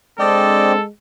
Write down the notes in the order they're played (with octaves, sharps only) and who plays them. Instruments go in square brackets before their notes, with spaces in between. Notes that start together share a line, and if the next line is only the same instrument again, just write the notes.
[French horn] G#3 [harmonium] C4 D4 [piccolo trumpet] A4 [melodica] D5 D#5 G5